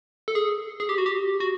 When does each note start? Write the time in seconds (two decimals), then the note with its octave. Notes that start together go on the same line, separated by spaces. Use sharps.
0.28 A4
0.35 G#4
0.80 G#4
0.89 G4
0.98 F#4
1.06 G4
1.40 F#4